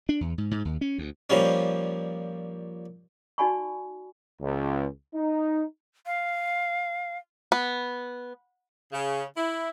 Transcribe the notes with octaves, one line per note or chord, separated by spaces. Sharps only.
D4
E2
G#2
G#2
D#2
C#4
D2
A#2 F3 G3 C#4
D#4 F#4 D5 G#5 B5 C#6
C#2
D#4
F5
B3
C#3
E4